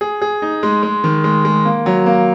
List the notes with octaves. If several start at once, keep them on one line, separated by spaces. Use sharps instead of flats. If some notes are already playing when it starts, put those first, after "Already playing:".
G#4
G#4
D#4
G#3
G#3
D#3
G#3
G#3
A#3
F#3
A#3